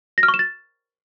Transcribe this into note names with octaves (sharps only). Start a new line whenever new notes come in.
A#6
F6
C#6
E7
A6